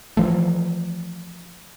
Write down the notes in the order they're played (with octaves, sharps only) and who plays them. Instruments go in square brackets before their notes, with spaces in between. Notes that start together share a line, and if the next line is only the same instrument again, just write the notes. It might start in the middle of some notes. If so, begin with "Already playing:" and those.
[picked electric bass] E3 F3 A3